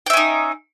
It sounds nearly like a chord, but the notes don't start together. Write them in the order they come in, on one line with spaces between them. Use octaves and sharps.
G5 E5 C#4 D#4